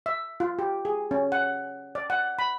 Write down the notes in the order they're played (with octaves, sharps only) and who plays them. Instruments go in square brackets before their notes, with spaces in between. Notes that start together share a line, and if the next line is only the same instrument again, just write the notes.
[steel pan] E5
F4
G4
G#4
C#4
F#5
D5
F#5
B5